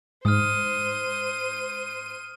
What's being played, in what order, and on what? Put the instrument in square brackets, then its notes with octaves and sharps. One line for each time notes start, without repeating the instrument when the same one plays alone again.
[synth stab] G#2 [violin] C5 D#7 [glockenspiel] D#6 F6